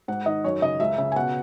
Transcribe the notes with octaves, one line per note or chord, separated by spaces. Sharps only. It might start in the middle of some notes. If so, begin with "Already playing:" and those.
G#2 F#5
D#3 D#5
F#2 C#5
C#3 D#5
C#2 E5
C#3 E5
G#5
B2 F#5